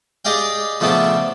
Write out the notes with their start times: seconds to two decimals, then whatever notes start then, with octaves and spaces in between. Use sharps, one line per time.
0.25 G4 G#4 D5 D#5 F5 G5
0.80 C#3 F3 A3 B3 C#4 D4